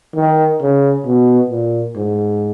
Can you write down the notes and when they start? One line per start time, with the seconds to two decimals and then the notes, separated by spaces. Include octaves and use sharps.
0.15 D#3
0.61 C#3
1.06 B2
1.50 A#2
1.96 G#2